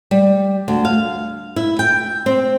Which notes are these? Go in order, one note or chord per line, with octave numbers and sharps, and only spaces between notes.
G3
D2
F5
E4
G5
C4